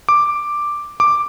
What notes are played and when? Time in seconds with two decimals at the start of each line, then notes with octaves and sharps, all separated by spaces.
0.09 D6
1.00 D6